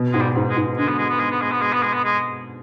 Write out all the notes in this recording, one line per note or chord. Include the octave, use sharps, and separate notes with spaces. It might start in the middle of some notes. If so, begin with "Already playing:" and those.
Already playing: B2
G#2 G#3
G3
G#2
G#3
G#2
D3 G#3
B3
G#3
B3
G#3
B3
G#3
B3
G#3
B3
G#3
B3
G#3